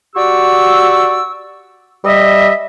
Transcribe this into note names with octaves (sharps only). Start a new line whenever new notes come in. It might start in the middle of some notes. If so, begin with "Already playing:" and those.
F#4 G4 D5 C#6 E6
G3 D#5 E5